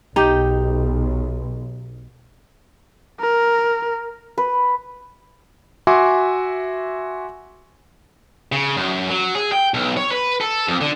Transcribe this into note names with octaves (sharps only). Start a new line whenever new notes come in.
B1 D#4 G4
A#4
B4
F#4 E5 G#5 C6 D6
C#3
F#2
F#3
G#4
G5
B1
C#5
B4
A4
F2
D3